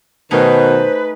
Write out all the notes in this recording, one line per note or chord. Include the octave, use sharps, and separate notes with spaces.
B2 D#3 A3 D#4 G#4 B4 C5